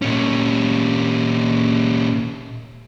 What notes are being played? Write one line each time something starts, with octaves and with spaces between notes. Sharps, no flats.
A#2 C#4